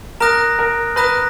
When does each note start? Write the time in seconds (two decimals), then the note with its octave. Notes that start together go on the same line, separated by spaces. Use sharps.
0.20 A#4 A#5 D#6 F#6 A#6
0.59 A#4
0.96 B4 A#5 D#6 F#6 A#6